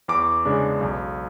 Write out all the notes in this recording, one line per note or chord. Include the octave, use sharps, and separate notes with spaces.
E2 D6
C#3 G#3 D4
B1